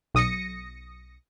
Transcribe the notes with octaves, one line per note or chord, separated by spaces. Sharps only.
B1 D#6 A#6 C#7